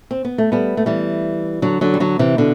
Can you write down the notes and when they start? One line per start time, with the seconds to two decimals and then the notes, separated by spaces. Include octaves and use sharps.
0.11 C4
0.25 B3
0.38 A3
0.52 G3 B3
0.77 A3
0.86 E3 G3
1.62 D3 F#3
1.81 D3 F#3
1.94 G3
2.00 D3 F#3
2.19 C3 E3
2.38 B2 D3